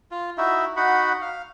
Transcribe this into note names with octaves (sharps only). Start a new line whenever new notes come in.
F4
D#4 E4 F#4 E5
D#4 F#4 F#5 B5
F5